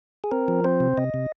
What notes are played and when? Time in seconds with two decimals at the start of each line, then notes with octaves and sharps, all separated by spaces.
0.24 G#4
0.31 C4 A#4
0.48 F3
0.64 C4 C5
0.80 C3
0.97 C3 D#5
1.14 C3